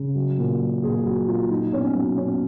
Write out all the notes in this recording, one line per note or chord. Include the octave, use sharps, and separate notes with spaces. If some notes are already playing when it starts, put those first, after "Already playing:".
Already playing: C#3
F#3
A#2
F#3
A#2 G#4
F#3 F#4
A#2 F4
F#3 D#4
B2 C#4
F#3 C#4
B2 C#4